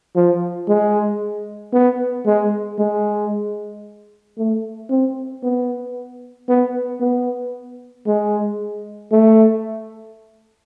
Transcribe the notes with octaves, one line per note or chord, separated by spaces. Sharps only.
F3
G#3
B3
G#3
G#3
A3
C4
B3
B3
B3
G#3
A3